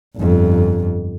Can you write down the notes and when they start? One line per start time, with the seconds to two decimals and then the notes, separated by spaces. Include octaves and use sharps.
0.17 G1 F2